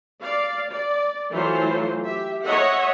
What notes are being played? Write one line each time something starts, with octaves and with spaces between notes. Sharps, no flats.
D5 F5
D5
E3 F#3 A3 F4 A4 C5
G4 E5
C#5 D#5 E5 F#5